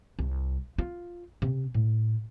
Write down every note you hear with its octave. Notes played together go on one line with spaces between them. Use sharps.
C2
F4
C3
A2